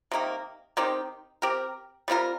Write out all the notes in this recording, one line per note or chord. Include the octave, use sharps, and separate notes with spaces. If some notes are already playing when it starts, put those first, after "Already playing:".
C3 D#3 A#3
D#3 C4 D#4 G4
C4 G4 A#4
G3 C4 F4 A#4